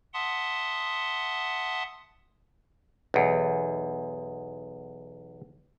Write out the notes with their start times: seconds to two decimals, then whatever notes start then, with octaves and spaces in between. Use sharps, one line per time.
0.14 E5 F#5 A5 C6 D#6
3.14 B1 E2